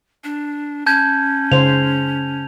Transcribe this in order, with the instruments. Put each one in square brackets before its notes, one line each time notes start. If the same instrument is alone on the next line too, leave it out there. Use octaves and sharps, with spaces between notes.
[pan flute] D4
[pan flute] C#4 [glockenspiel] A5 G6 G#6
[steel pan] C#3 C5 [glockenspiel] F7